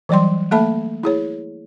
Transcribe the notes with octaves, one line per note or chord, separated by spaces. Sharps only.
E3 F#3 G3 D5 G5 C6
A3 A#3 A4 E5 A5 B5
E4 G#4 C#5